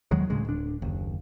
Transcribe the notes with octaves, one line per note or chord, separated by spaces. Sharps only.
D#2 D#3 F#3 G#3
D2 A2 C#3 G#3
D1 D4
F#1 D#2